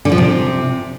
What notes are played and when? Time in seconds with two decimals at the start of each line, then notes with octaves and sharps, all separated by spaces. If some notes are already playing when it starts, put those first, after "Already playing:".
0.05 D3
0.12 F3
0.18 C3